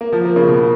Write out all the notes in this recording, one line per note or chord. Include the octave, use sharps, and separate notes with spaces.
A#3
F3
A#3
C#3
B2